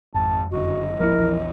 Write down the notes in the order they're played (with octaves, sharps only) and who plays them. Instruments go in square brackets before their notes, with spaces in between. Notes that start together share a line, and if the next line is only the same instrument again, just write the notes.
[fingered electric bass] G#1 [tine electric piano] F2 [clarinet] A5
[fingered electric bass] F#1 F#2 D3 [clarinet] F#4 [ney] D#5
[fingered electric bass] D1 G#1 A#3 [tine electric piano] F3 E4 [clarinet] A#4
[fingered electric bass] A#1 E2 E3